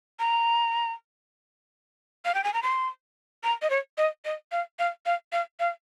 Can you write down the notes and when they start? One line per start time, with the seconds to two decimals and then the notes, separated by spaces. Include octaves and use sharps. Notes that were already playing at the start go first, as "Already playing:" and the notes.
0.19 A#5
2.25 F5
2.34 G5
2.44 G#5
2.54 A#5
2.62 C6
3.43 A#5
3.62 D#5
3.70 C#5
3.98 D#5
4.25 D#5
4.52 F5
4.79 F5
5.06 F5
5.32 F5
5.60 F5